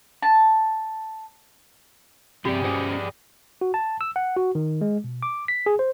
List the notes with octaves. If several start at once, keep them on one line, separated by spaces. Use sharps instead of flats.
A5
G2 C3 G3 C4 G4 G#4 D5
C#4 F#4 C5 D#5
F#4
A5
E6
F#5
F#4
D#3
G#3
B2
D6
B6
G#4
C5